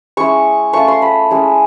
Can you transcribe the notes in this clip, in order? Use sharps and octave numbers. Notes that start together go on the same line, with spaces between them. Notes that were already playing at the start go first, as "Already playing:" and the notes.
G#3 C#4 E4 C#6
A3 C#4 F4 C#6
C6
B5
G#3 C#4 E4